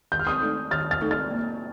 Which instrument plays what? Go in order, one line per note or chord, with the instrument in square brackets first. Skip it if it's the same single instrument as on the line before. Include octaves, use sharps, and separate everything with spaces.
[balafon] D#3 [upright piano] G6
[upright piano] F6
D#6 G6
[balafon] A3 D#4 A4
[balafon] D#3 [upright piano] F6 A6
[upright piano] F6 A6
[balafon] A3 D#4 A4
[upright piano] F6 A6
[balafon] A#3